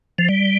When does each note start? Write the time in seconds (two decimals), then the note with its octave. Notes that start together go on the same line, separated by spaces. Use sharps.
0.18 F3
0.28 G3